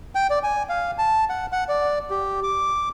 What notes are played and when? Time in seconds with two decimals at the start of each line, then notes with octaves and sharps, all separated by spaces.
0.15 G5
0.30 D5
0.43 G#5
0.69 F5
0.98 A5
1.29 F#5
1.52 F#5
1.69 D5
2.10 G4
2.43 D6